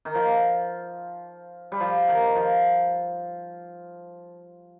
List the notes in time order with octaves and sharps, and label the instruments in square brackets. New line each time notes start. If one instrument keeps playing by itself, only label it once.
[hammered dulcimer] D#3
F3
G3
F3
D#3
F3